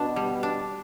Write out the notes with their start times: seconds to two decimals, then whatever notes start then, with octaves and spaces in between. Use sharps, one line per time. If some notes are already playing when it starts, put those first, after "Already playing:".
Already playing: B2 D4
0.16 G3
0.43 D4